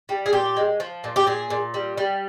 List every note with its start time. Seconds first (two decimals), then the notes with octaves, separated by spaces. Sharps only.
0.09 G3
0.26 G#4
0.33 A#2 G4
0.57 G#3
0.80 F3
1.04 A#2
1.16 G4
1.27 A#2 G#4
1.50 A#2
1.74 G3
1.98 G3